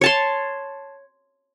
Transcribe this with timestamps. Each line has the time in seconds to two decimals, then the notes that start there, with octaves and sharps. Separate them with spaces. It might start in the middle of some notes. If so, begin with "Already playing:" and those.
0.01 C#5 A5 C6